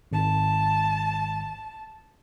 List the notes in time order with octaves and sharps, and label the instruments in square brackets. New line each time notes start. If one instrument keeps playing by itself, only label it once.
[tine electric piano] G#1 [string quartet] A5